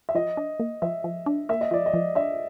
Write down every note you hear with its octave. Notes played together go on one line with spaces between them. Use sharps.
E5
F3 D#5
D4
A#3
F3 E5
F3
D4
A#3 E5
D#5
F3 D5
D#5
F3
D4 E5